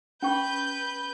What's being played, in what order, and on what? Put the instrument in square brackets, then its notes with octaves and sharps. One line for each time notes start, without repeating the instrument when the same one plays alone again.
[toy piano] C#4 G5 C#6 [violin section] B4 G6